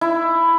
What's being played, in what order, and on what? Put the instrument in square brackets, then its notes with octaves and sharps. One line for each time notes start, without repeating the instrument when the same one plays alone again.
[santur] E4